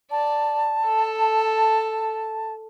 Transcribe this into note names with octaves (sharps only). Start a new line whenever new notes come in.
D5 A5
A4